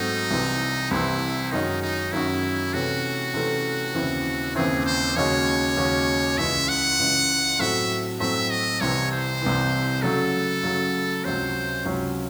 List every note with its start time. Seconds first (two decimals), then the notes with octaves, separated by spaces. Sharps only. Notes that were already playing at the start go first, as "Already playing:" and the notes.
Already playing: G#2 F#3 A3 C4 D#4 F#4
0.30 C2 C3 E3
0.91 C2 C3 E3 E4
1.51 F#2 D#3 G#3 C#4 D#4 F#4
1.82 D#4
2.12 F#2 D#3 G#3 C#4 E4 F#4
2.73 C3 E3 A3 C#4 F#4
3.34 C3 E3 A3 C#4
3.94 D#2 C#3 E3 C4 E4
4.55 D#2 C#3 E3 C4 E4 G#4
4.85 C5
5.16 D#2 C#3 G#3 C#4 F#4 C#5
5.77 D#2 C#3 G#3 C#4 F#4
6.37 C#2 C#3 E3 G#3 E5
6.69 F#5
6.98 C#2 C#3 E3 G#3
7.59 A2 F#3 C4 F#4 A4 E5
8.20 A2 F#3 C4 F#4 A4 E5
8.50 D#5
8.81 C2 C3 E3 C#5
9.12 C5
9.41 C2 C3 E3
10.02 C#3 F#3 A3 A4
10.63 C#3 F#3 A3
11.24 C#2 C3 F#3 C#4 C5
11.85 C#2 C3 F#3 C#4